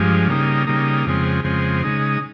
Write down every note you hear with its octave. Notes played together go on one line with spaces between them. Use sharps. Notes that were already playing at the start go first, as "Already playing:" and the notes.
Already playing: G2 F3 G#3
C#3 G3 A#3 D#4
C#3 G3 A#3 D#4
F2 C#3 G#3 C4
F2 C#3 G#3 C4
C#3 G#3 D#4